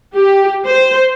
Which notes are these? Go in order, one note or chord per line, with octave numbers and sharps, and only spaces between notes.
G4
C5